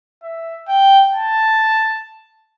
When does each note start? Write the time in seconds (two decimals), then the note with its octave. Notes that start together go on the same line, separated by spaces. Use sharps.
0.23 E5
0.68 G5
1.14 A5